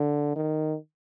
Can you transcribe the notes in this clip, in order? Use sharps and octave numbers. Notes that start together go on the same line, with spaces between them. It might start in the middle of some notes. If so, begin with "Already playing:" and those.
Already playing: D3
D#3